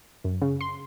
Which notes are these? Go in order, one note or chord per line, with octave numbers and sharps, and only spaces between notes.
F#2
C#3
C6